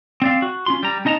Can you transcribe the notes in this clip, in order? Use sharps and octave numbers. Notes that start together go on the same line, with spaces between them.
C4 D5 F5
F#4
C#4 F4 C6
G3 A#5
C#4 D#4 D#5 A5 A#5